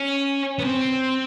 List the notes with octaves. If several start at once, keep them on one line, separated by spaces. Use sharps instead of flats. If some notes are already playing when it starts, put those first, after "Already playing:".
Already playing: C#4
B3
C4